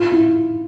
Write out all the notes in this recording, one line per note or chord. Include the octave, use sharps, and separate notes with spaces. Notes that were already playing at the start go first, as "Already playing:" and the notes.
Already playing: F4
E4